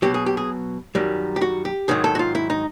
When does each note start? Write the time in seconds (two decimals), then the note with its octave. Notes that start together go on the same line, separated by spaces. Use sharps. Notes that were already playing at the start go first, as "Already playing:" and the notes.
0.02 B2 F#3 G4
0.14 G#4
0.26 G4
0.37 G#4
0.95 F#2 D#3 G3
1.36 G4
1.41 F#4
1.65 G4
1.88 G#2 D#3 F#3 G#4
2.04 A4
2.15 F#4
2.19 F4
2.35 E4
2.50 D#4